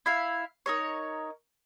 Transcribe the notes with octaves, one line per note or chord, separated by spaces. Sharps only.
E4 E5 F5
D#4 A#4 C#5